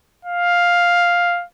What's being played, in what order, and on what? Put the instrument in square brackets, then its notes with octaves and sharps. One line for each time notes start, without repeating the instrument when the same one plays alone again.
[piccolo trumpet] F5